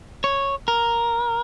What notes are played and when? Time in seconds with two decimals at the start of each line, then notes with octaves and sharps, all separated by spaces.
0.24 C#5
0.68 A#4